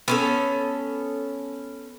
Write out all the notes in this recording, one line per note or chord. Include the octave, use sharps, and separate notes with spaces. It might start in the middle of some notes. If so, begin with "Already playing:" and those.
B3 C#4 A4